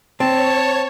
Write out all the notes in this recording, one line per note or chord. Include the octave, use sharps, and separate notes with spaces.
C4 C#5 A5